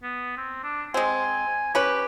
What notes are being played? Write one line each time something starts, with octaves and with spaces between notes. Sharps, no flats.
B3
C4
D4
G#3 C4 G#5
C#4 G4 B4